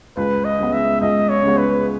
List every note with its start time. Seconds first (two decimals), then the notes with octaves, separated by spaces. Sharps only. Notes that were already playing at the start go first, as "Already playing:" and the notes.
0.17 C#2 B4
0.45 D#5
0.59 C#3 G#3 B3
0.73 E5
1.01 C#2 D#5
1.29 C#5
1.43 C#3 G#3 B3
1.58 B4